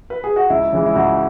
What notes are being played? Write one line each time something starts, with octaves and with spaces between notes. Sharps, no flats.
B4
G#4
F#4
C#2 E4
C#3 E3 G#3
E4
C#2 F#4